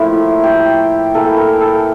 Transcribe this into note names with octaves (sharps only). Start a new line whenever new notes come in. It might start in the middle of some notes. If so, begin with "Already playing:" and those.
Already playing: A2 F3 A#3 E4
G4
A2 E3 A#3 A4
A#4
A4